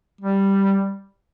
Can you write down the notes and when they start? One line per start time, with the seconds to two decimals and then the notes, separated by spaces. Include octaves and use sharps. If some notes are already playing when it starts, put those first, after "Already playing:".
0.21 G3